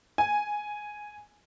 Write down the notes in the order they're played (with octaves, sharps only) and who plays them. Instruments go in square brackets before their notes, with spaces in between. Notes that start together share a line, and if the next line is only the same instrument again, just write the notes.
[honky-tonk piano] G#5